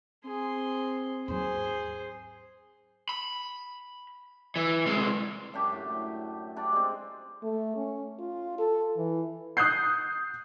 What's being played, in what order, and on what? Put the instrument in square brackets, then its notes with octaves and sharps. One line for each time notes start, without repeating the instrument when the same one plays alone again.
[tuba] C4 [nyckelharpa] G#4 C6
[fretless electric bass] D#2 G#2 F#3 [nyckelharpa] G#4 C5
[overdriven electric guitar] B5
E3
C2 G#3
[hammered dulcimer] F#2 D4 G4
A2
G3 D4 D5
G#3 C4
[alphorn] A3
C#4
F4
A4
E3
[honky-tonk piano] D#6 F#6 G6 C7